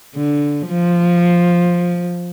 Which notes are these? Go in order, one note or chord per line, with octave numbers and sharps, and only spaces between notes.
D3
F3